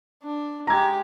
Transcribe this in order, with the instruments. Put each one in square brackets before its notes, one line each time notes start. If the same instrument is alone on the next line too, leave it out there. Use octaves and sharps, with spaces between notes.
[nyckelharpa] D4
[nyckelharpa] G#3 G4 [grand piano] A#5 G#6